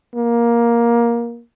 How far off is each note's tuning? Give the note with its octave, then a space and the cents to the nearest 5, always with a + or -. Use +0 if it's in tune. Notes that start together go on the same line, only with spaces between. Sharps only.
A#3 +15